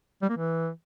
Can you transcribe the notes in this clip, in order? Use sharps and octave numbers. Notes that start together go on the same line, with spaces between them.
G3
A#3
E3